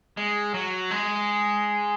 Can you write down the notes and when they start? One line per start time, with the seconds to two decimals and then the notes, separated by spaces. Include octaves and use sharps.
0.17 G#3
0.54 F#3
0.91 G#3